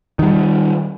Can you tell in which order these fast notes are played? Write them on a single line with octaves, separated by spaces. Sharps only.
D#3 F#3 G3